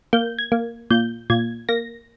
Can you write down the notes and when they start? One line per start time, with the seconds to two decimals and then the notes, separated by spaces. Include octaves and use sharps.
0.13 A#3 G6
0.39 G#6
0.52 A#3
0.90 A#2 G6
1.30 A#2 G#6
1.69 A#3 A#6